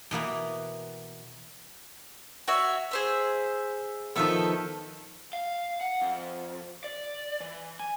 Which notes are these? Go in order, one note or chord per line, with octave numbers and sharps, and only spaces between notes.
B2 E3 A#3 B3
F#4 C#5 E5
G#4 C5 E5
D#3 F3 B3 A4 E5
F5
F#5
F2
D5
E3
G#5